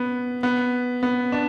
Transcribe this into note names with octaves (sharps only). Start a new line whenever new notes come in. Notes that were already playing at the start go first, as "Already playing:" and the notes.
Already playing: B3
B3
B3
D4